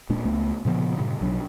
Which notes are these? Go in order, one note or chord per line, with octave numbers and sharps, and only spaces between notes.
D#1 A#2 G#3 D4
C#2 A3 B3
A#2 C#3 F3 B3
G2 A#2 C#3
B1 F#3 D4